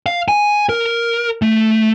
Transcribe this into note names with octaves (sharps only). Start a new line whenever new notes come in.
F5
G#5
A#4
A3